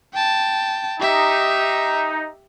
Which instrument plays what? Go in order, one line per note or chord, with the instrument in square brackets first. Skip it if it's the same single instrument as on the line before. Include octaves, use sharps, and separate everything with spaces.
[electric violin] G5 A5
[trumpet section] D#4 [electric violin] G4 E5